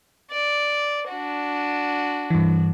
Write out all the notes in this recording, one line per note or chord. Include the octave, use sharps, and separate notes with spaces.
D5
D4 F#4
G2 E3